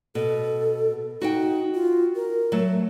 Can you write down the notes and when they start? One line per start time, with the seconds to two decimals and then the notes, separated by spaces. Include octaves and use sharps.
0.15 B2 A4
1.21 D#4 F#4 F#5 G5
1.74 F4
2.16 A#4
2.52 F#3 A3